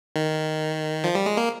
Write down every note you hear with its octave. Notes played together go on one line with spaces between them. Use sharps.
D#3
F3
G3
G#3
A#3